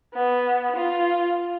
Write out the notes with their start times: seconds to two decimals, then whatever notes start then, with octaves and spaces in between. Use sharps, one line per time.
0.14 B3
0.76 F4